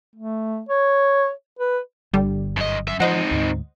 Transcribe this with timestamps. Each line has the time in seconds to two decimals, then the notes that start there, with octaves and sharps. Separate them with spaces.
0.15 A3
0.69 C#5
1.59 B4
2.14 G1 D3 G3
2.57 F#2 D#5
2.88 F#2 E5
3.00 F3 C4 D#4 C5 D#5 F#5
3.31 D2 G#2